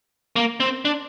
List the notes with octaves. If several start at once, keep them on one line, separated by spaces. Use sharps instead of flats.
A#3
C4
D4